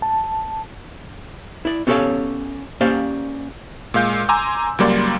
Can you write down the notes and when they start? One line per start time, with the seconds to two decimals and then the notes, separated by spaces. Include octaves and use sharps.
0.02 A5
1.65 E4 D5
1.87 B3 C#4 G4 A4 C#5 F5
2.81 A#3 C#4 G4 C5 D5 F5
3.94 A#2 G#3 F5 G6
4.29 G#5 A#5 C6 D6 E6
4.78 C#2 F#3 G3 A#3 D5 C6